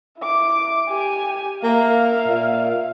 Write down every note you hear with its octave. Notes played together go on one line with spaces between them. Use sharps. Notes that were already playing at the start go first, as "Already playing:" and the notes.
E4 D6
G4 G#5
A#3 E5 F5
A#2